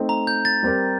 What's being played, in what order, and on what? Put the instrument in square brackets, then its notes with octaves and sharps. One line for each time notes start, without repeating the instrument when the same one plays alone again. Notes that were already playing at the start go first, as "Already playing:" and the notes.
Already playing: [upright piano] A3 C4 D#4
[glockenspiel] A#5
G6
A6
[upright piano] G3 C4 G4 A#4